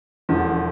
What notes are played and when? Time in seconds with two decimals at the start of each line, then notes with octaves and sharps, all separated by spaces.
0.29 E1 E2 D3 F3